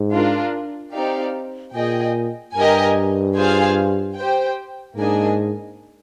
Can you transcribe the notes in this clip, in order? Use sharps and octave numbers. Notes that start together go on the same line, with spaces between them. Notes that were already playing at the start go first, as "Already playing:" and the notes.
Already playing: G#2
D4 F4 A#4
C4 D#4 G4 D5 F5
A#2 G#4 D#5 G5
G2 G4 A#4 D#5 G#5
F4 G#4 C5 F5 G#5
G4 C5 G5
G#2 A#3 D4 G#4 D#5 G#5